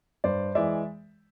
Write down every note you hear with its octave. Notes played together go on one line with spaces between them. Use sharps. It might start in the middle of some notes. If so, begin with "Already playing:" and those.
G2 C5 D5
E3 G#3 D5 E5